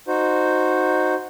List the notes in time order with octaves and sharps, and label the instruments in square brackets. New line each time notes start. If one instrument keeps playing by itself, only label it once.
[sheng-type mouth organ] D#4 F#4 C5